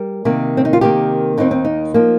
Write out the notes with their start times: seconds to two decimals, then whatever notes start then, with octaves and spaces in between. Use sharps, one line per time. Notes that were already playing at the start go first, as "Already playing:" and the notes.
Already playing: G3 A#4
0.25 C3 D#3 A#3
0.57 C4
0.65 D#4
0.73 F4
0.81 C3 D#3 A#3 G4
1.38 D#2 D#3 C4 D#4
1.51 C4
1.65 D#4
1.94 F3 A#3